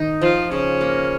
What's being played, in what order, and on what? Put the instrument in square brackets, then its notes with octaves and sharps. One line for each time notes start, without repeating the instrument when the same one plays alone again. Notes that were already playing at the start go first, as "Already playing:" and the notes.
Already playing: [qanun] D#3 D#4
[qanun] F3 [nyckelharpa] F4
[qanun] C#3 [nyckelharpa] C#4
[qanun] A#3